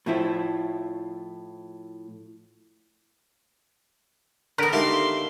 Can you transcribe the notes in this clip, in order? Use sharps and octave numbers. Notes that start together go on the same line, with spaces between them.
A2 F3 E4
D3 B3 A#4
A3 D#4 G4 A#4 F5 C6